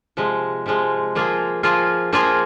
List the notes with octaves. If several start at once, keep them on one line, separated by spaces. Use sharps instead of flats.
C3 F3 G#3
C3 F3 G#3
F3 A#3 F4 G#4
F3 A#3 F4 G#4
F3 A#3 F4 G#4